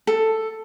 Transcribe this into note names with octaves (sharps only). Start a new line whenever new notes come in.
A4